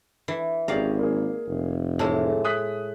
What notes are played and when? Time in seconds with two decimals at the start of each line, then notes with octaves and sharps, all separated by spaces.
0.28 E3
0.68 G#1 C#4 G4 G#4 D5 F5 A#5
0.99 A#3 G#4
1.46 F1
1.99 A2 E3 G#3 A5
2.45 D#6 F#6 B6